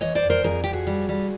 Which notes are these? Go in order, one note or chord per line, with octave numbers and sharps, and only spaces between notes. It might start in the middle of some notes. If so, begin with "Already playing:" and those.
E3 C#5 D#5
C5 D5
F2
A#4 C5
F2 G#4 A#4
F2 G4
F#4 G#4
G3
G3